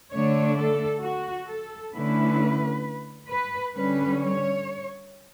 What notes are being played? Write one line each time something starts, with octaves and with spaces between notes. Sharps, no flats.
D3 A3 D4 C#5
A4
F#4
A4
D3 A3 C#4 E4 B4
B4
D3 G3 C#4 B4
C#5